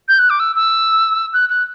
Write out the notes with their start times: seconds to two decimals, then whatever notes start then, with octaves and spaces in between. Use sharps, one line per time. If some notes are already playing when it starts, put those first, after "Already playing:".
0.08 G6
0.19 F#6
0.30 D6
0.40 E6
0.56 E6
1.33 F#6
1.49 F#6